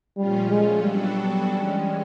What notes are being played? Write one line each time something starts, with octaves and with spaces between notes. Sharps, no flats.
A#2 F3 G3 A3 C#4 F4
G#3
F#3 G3 B3 D4 F#4 A4
E3 G#3 C#4